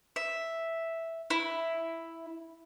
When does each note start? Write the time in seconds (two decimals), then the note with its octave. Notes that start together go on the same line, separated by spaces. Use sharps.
0.16 E5
1.30 E4